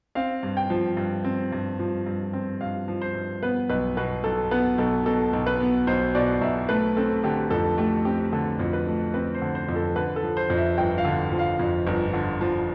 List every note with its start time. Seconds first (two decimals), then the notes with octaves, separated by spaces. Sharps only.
0.15 C4 F5
0.43 G2
0.57 G5
0.70 F3
0.97 G2
1.24 C4
1.52 G2
1.79 F3
2.06 G2
2.33 C4
2.61 G2 F5
2.88 F3
3.02 C5
3.15 G2
3.43 B3 B4
3.69 B1 B4
3.97 B2 B4
4.24 B1 A4
4.51 B3 B4
4.78 B1 A4
5.06 B2 A4
5.33 B1
5.47 B4
5.60 B3
5.87 B1 C5
6.15 B2 D5
6.42 B1 E5
6.69 A3 B4
6.97 C4 A4
7.24 D3 G4
7.50 F2 A4
7.78 A3 G4
8.05 C4 G4
8.32 D3 A4
8.59 F2
8.73 B4
8.87 A3
9.14 C4 B4
9.35 C5
9.42 D3
9.55 C5
9.69 F2
9.76 A4
9.96 D3 B4
10.16 A4
10.23 F3
10.37 C5
10.50 F2
10.57 E5
10.78 G1 G5
10.98 F5
11.05 D3
11.32 F3
11.39 F5
11.59 F2
11.87 G1
12.13 D3
12.41 F3